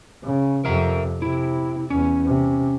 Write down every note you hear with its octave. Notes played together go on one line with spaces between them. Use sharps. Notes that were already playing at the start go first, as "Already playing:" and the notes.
C#3
F2 C3 A#4 E5 A#5
C3 E4
E2 C#4
C3